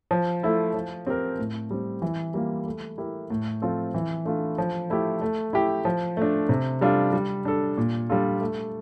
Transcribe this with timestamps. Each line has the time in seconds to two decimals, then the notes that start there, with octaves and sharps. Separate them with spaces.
0.11 F3
0.43 A3 E4 A4
0.74 F3
1.07 C4 G4 A#4
1.38 A2
1.71 G3 C4
2.02 E3
2.34 G3 A#3 F4
2.66 A3
2.98 E4 G4 A#4
3.30 A2
3.62 F3 C4 F4 A4
3.95 E3
4.25 A3 D4 F4
4.58 F3
4.90 A3 E4 G4
5.21 A3
5.53 E4 G4
5.85 F3
6.17 A3 D4
6.49 C3
6.81 G3 D4 F4 A4
7.13 G3
7.45 D4 A4
7.77 A#2
8.09 G3 D4 F4 A4
8.41 A3